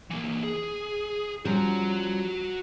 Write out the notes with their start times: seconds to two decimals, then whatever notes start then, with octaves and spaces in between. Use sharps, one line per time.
0.10 E3 A#3
0.43 G#4
1.45 F3 G3 C#4 F#4 A#5